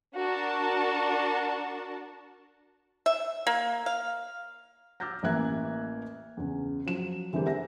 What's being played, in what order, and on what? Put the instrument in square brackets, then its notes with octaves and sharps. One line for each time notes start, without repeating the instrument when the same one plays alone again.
[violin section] D4 F#4 A#4 A5
[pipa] E5
A#3
F5
[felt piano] D6 E6 F6 G6 A6 A#6
A1 E3 A#3 E5 F#6 G#6
E2 C#3
F3 F#3 E7
D3 E3 G#3 C4 G4 A#4
C4 E5 A#6